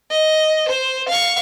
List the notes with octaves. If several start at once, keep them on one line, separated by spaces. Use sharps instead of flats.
D#5
C5
F5 C#6